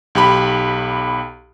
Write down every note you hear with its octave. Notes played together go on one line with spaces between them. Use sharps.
B1 G4 B5